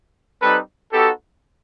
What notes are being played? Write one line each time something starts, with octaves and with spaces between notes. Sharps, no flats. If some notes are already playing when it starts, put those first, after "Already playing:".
G3 C4 D#4 A4 B4
B3 D#4 F#4 G4 A4